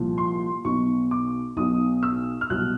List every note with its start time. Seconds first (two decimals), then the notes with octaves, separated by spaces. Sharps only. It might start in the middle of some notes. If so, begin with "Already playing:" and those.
Already playing: C2 A#2 F3
0.18 C6
0.65 B1 B2 F#3 C#6
1.11 D6
1.57 B1 B2 F#3 D#6
2.03 E6
2.41 F6
2.50 C2 B2 F#3 F#6